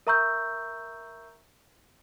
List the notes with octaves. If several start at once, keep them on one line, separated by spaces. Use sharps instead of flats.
A#4 E5 A#5 C#6 E6 G6